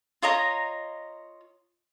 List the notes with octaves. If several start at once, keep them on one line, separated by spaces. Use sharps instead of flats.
F4 C#5 D#5 A#5